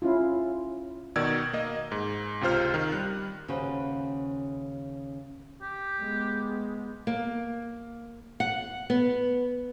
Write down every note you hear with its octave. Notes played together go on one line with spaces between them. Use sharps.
C#4 E4 F4
B2 D#3 D5 E6 G#6
A#3 D#5
G#2
C#2 C3 F4 C5 F6
D#3
G3 F#6
D#2 C#3 C#4 F#4 B4 C5
G4
G#3 B3
A#3
F#5
B3